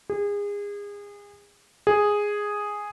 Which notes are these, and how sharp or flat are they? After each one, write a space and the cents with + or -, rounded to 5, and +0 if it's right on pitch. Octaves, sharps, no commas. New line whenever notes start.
G#4 -30
G#4 -5